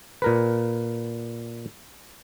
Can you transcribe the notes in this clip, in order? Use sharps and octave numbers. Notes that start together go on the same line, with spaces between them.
A#2 A#4 B4